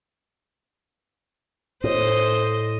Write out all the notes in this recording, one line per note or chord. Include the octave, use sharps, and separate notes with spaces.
A2 C5 D#5